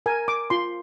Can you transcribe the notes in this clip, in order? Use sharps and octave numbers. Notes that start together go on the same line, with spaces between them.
A#4 G#5
D6
F4 C6